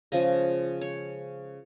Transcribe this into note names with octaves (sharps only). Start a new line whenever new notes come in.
C#3 F3 G#3 D#5
C#5